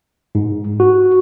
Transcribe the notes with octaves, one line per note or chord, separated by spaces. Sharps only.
G#2
F#4